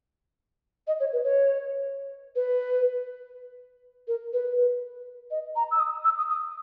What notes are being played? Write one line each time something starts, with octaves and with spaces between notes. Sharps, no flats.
D#5
C#5
B4
C#5
B4
A#4
B4
D#5
A#5
E6
D#6
E6
D#6
D#6